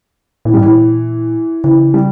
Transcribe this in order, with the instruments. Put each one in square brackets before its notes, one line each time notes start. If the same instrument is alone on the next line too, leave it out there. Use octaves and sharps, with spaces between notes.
[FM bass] A#2 [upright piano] E3
[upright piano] G3
[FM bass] G#2
[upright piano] E3
[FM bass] A#2
[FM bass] C#3 [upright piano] E3
[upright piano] G3